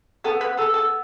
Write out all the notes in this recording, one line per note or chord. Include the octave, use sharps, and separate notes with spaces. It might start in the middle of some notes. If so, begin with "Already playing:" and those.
B3 A4
B4
B3 A4
A4